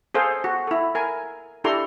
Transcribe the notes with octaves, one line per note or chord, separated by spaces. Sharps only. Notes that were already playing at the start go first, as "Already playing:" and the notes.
G#4 A4 C5 F5
F#4
E4 A4
A#4 G#5
D4 E4 G4 A4 A#5 C6